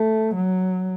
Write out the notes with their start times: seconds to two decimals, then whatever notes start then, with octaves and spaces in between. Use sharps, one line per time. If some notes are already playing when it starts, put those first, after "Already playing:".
Already playing: A3
0.35 F#3